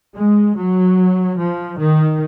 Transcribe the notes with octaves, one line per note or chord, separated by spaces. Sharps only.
G#3
F#3
F3
D#3